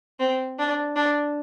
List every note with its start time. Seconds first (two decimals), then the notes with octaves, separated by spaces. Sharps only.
0.20 C4
0.59 D4
0.96 D4